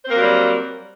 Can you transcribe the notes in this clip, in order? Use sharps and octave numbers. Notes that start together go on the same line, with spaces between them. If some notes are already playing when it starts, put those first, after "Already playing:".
F#3 G3 A#3 C4 C5